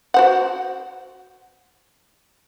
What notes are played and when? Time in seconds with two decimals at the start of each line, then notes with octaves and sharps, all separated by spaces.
0.14 F#4 C5 F#5